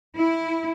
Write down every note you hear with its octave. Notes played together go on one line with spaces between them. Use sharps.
E4